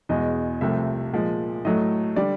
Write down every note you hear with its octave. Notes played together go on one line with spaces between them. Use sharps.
E2 B2 G#3 D#5
C2 C3 F3 A3 E5
A#2 F3 G#3
A2 F#3 A3 D#5
D3 G3 D5